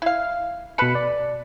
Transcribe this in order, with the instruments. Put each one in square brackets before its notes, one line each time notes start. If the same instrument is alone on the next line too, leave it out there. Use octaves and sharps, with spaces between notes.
[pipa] E4 F5
[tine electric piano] B2 B5 C#7 [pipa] A4 B4
[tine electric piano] D5